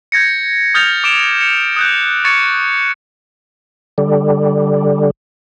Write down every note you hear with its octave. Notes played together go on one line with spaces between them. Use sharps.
G6 G#6 A#6 C#7
D#6 F6 G6 A6 A#6 F7
D6 D7 E7
C#7
D#6 F#6 G6
C#6 G#6 A6 C#7
D3 G3